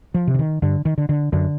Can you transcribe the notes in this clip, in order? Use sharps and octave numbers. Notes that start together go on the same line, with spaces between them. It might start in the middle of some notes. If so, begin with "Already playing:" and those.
F3
C3
D3
D#3
G2 D3
D#3
D3
D3
F#2 D3